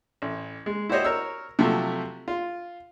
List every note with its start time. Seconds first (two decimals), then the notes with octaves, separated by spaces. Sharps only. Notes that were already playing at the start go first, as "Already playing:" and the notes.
0.22 A1
0.66 G#3
0.89 E4 F#4 G4 C5 C#5 D#5
1.04 A#4 C#5 E6
1.59 C3 F3 F#3 A3
2.28 F4